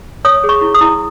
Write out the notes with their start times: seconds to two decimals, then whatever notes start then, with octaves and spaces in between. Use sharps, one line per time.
0.25 C#5 D#6
0.44 G#4
0.49 C#6
0.61 E4
0.74 D#6
0.81 E4